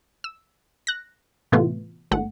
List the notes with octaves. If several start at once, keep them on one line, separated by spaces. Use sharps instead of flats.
E6
F#6 A#6
A2 C3 E3 A3 B3 F4
G#1 A3 F#5